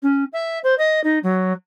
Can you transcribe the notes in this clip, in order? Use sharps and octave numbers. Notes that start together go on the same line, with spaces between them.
C#4
E5
C5
D#5
D#4
F#3